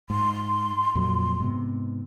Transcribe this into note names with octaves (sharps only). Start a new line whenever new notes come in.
G#2 C6
F2 A#2 F#3
G#2 C3 B3